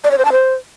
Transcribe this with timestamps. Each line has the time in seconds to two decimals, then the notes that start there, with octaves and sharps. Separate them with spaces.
0.04 D5
0.11 C#5
0.18 C5
0.25 A5
0.32 C5